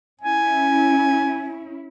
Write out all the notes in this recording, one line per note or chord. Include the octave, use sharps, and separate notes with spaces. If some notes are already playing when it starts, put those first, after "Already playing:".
C#4 E4 G#5